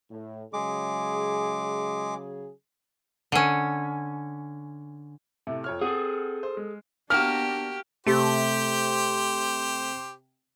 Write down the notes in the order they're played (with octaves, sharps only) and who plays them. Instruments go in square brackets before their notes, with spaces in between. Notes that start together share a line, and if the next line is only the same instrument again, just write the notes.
[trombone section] A2
[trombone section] C#3 F#3 G#4 [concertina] G#3 D6
[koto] D3 C#4
[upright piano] A2 C3 A3
F2 C#5 F6
[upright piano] C4 F#5 [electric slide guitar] G#4 A4
[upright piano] C5
G#3
[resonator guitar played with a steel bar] A#3 F#4 [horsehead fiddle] B3 D4 [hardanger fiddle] G4 [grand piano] F6
[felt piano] C3 [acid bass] A3 [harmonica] G4 C5